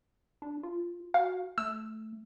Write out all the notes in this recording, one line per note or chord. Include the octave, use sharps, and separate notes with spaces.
D4
F4
F#4 F5
A3 E6